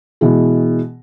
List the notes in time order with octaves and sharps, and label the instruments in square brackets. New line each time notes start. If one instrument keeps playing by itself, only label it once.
[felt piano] B2 E3 G#3